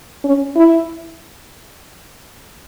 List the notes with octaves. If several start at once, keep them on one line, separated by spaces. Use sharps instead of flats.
C#4
E4